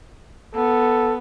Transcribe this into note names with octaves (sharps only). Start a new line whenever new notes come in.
B3 A4